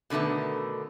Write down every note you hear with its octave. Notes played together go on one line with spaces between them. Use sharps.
B2 D3 D#3 A3 B3